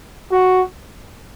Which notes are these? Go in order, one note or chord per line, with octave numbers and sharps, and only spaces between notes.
F#4